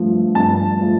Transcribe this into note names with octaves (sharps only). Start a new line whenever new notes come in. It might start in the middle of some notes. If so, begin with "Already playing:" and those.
Already playing: G2 F3 A3
G2 A5
F3 A3